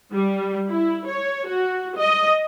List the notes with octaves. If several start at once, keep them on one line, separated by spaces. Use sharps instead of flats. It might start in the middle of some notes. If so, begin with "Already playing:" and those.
G3
E4
C#5
F#4
D#5